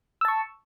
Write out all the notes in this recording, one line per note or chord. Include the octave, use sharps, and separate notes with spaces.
A5 C#6 E6